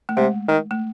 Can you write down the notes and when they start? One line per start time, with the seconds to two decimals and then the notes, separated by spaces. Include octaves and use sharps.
0.09 A3
0.17 C3 G#3
0.48 D#3
0.71 A3